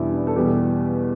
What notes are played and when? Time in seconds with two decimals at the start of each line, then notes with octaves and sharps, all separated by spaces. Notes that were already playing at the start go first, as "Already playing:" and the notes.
Already playing: E2 B2 G3 D4 E4
0.13 D4
0.27 A4
0.36 E2 B2 G3 G4